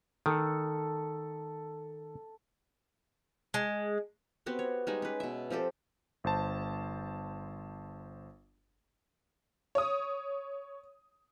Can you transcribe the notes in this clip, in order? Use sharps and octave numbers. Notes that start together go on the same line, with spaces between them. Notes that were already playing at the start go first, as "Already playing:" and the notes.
D#3 A4
G#3
B3 C4 F#4 G4
C#5
G3 G#3 D#4 G#5
C#4 B4
B2 E5
F3 C4 G4 A4
G1 C5 A5
C#5 D#6